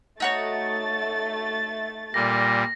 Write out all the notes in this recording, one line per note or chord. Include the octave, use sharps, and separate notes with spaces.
A3 D#4 F#4 C#5 A6
A#2 G3 A#6